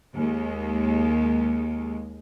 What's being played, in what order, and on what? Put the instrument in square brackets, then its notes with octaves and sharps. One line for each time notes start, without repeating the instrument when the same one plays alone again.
[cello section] D#2 G#3